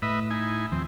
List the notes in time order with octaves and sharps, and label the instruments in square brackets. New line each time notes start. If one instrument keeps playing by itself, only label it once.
[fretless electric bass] A2 [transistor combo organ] B4 D#5 E5
[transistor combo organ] D#4 E4 G#5
[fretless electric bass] D#2 F3 [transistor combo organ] C4